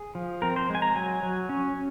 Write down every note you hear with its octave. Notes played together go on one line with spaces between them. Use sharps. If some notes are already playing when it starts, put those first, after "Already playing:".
Already playing: G#4
F3
C4 A#4
C5
G#3 G#5
A#5
F#3 G#5
F#3
C#4